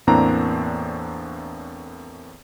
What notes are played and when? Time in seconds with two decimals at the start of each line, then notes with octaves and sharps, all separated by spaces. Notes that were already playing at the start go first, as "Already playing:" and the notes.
0.07 E2 A2 A#3 C4 D4 A#5